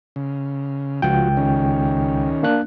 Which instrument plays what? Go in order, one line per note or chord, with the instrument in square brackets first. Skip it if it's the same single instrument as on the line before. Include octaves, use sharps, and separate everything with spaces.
[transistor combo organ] C#3
[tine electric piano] C#2 G5 [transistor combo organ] F3 F#4
[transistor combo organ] D#3 C#4
[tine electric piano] A#3 D4 F#6